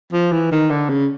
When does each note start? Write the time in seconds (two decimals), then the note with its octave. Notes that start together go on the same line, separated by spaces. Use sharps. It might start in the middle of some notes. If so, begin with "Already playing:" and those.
0.13 F3
0.32 E3
0.52 D#3
0.70 D3
0.89 C#3